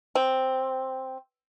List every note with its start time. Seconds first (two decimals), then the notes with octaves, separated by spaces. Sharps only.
0.15 C4